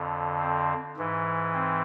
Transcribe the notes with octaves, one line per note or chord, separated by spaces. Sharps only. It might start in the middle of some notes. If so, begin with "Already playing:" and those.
Already playing: F2 D3
C4
G#2 E3
C4